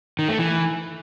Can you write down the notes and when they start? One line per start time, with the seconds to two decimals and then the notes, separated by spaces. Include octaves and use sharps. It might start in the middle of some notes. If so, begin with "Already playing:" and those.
0.19 D#3
0.29 A3
0.39 E3